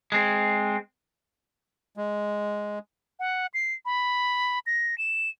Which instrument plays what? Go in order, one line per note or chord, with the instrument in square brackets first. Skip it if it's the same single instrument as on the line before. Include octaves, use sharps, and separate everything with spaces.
[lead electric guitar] G#3 C4
[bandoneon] G#3
[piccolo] F#5
C7
B5
A#6
E7